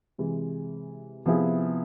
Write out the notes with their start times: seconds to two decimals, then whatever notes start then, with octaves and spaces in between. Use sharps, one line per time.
0.18 C3 E3 G#3
1.26 C3 F3 B3 E4 G#4